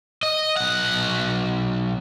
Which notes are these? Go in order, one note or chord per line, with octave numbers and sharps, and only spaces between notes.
D#5
B1 F#5